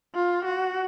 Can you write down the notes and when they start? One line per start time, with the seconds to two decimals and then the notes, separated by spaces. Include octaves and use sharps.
0.14 F4
0.45 F#4